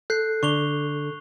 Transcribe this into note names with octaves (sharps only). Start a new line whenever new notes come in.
A4 F#6 G6 C7
D3 C#6 F7 G7